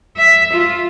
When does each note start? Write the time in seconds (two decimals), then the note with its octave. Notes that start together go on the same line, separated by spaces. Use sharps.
0.17 E5
0.53 F4